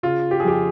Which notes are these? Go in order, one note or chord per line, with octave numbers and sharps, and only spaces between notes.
C#3 F4
G4
G#4
F2 G4